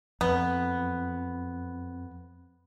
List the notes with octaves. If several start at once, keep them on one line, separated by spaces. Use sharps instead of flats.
F2 B3